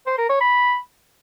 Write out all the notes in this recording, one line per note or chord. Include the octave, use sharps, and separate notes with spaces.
C5
A#4
C#5
B5